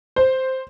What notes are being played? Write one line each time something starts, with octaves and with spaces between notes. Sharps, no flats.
C5